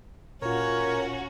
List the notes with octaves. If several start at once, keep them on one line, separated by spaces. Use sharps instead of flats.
A#2 C#4 F4 F#4 A#4 C#5